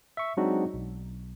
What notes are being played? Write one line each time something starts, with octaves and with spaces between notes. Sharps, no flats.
E5 C#6
F#3 G#3 C4 D4 D#4 F#4
B1